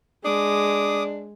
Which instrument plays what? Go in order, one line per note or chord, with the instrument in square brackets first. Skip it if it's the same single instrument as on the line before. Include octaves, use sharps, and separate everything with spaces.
[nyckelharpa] G#3 [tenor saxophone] D4 [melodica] D6 D#6